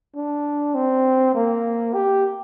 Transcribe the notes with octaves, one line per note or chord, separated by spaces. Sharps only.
D4
C4
A#3
G4